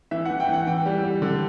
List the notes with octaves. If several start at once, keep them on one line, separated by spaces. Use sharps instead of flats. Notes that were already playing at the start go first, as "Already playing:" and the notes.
E3 E5
F#5
E3
G5
E3 F#5
E3 G5
G3
G3
D3